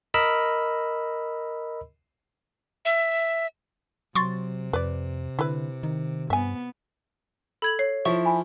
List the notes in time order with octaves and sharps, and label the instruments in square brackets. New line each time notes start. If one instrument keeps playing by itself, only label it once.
[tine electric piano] A#4 D#5 B5 E6
[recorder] E5
[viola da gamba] C3 [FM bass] F#3 [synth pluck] C6 C#6 A6
[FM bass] F2 [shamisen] B4 D5
[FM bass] D3 [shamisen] E4 B4
[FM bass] D#3
[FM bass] G2 [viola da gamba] B3 [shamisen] E5 G#5
[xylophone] A4 G#6 F#7 [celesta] B5
[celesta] C#5 [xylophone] C7
[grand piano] F3 E4 [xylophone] C#6
[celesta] G#5 B5